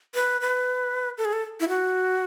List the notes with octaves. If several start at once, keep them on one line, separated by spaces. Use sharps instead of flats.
B4
B4
A4
G#4
A4
E4
F#4